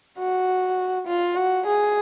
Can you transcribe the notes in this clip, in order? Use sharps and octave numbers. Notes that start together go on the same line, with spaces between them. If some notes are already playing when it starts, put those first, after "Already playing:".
F#4
F4
F#4
G#4